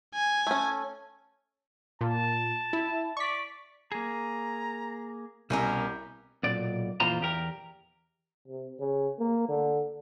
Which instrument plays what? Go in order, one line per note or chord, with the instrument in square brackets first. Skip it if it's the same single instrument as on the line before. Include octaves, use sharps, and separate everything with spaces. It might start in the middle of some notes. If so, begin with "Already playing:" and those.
[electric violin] G#5
[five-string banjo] A3 C#4
[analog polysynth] A#2 [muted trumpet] A5
[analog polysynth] E4
[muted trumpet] D5 [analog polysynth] C#6 B6
[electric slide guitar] A#3 G#4 [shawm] A#5
[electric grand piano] C2 [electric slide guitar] B2 E4 [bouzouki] A#3 C#4 A#4 [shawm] G4
[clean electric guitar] B1 A#2 D5
F2 A#2 E3 F4 C5 A#5
E2 G4 A#4
[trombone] C3
C#3
A#3
D3